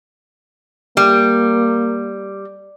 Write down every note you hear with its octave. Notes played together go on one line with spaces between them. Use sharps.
G3 A#3